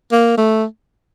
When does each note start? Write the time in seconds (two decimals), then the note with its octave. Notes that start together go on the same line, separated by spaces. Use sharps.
0.12 A#3
0.37 A3